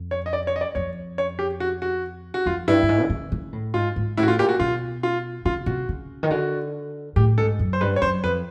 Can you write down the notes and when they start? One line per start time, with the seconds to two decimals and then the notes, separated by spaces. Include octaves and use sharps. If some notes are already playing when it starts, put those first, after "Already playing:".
Already playing: F2
0.11 C#5
0.26 D#5
0.33 D5
0.47 C#5
0.56 D#5
0.61 D5
0.75 F2 C#5
1.18 C#5
1.39 G4
1.60 F#4
1.82 F#4
2.34 F#4
2.46 F2 F4
2.68 G2 E4
2.83 G2
2.89 G#2
3.02 D3
3.10 C#3
3.32 C#3
3.53 A2
3.74 G#2 F4
3.96 G#2
4.17 A2 E4
4.23 F#4
4.28 F4
4.39 A#2 G4
4.49 F#4
4.60 B2 F4
5.03 F4
5.45 C3 F4
5.66 C3 F#4
5.89 C#3
6.23 D#3
6.30 D3 F#4
7.16 A2 G4
7.37 G#2 A4
7.59 F#2
7.73 C5
7.81 G2 B4
7.96 C#5
8.02 F#2 C5
8.24 F2 B4